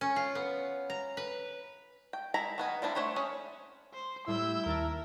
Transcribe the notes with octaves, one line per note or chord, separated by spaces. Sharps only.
C#4
F4
B3
A#5
B4
G5
G#3 E4 A#5 B5
D#3 B3 G#5
G3 C4 D4 E4
A3 D4 C5 C#5 B5
C#4 G#4
C5
A2 G3 E4 E6 G6
D#2 A#4 A5